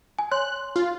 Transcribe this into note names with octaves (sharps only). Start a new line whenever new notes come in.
G#5
C#5 C6 F#6
F4